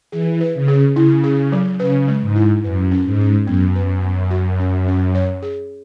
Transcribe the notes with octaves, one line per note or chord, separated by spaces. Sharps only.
E3 G#4
B4
C#3
G#4
C#3 E4
G#4
F#3
C#3 B4
G#3
G#2
E4
F#2 B4
C#4
G#2
C#4
F#2 B3
B4
B3
F#4
C#4
C#4
C#5
G#4